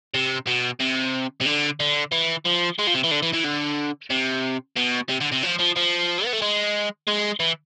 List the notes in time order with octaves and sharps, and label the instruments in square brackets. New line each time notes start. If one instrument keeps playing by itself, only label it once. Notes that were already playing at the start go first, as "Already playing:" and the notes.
[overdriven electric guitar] C3
B2
C3
C3
D3
D3
E3
F3
G#3
F3
C3
E3
D3
E3
E3
D3
C3
B2
C3
D3
C3
F3
F3
F3
B3
A3
G#3
G#3
E3